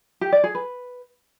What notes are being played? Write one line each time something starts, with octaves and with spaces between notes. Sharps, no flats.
G4
D5
G#4
B4